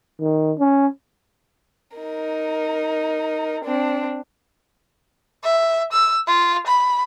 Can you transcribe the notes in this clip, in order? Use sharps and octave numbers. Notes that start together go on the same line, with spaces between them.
D#3
C#4
D#4 A#4
C4 D4
E5
E6
F4
B5